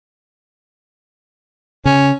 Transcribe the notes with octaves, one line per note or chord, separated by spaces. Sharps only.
C#3 C#4